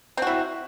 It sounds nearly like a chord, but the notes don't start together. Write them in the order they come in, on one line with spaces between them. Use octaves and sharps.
C4 F#4 E4